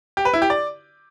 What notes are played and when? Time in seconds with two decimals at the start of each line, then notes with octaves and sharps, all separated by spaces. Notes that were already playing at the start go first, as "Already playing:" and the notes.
0.17 G4
0.25 B4
0.33 E4
0.42 G4
0.50 D5